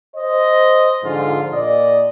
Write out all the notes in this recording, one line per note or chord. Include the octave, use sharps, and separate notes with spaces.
C5 D#5
G#2 D3 F3 F4
A#2 D5 D#5